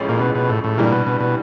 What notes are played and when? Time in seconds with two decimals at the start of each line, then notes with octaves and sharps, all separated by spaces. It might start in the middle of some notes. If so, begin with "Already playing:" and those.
Already playing: A1 A2 F3 G#3 C#4
0.09 A#2
0.20 B2
0.35 B2
0.49 A2
0.64 A2
0.78 G2 A#2 E3 G3
0.92 B2
1.06 B2
1.20 B2